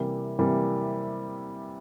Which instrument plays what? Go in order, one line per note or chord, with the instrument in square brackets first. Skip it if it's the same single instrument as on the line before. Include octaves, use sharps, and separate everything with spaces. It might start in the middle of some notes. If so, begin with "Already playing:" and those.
Already playing: [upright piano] C3 E3 G3 A#3
C3 E3 G3 A#3